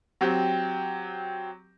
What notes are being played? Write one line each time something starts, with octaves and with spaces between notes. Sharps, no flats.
F#3 C4 G4